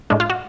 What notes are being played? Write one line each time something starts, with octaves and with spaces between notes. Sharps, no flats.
A2 G#3 D4
F4
F#4